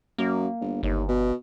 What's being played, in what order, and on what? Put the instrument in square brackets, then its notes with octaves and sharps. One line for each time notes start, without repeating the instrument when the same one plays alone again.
[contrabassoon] F#2 [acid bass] A#3
[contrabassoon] G1
[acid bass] G1 [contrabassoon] D#2
[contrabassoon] B2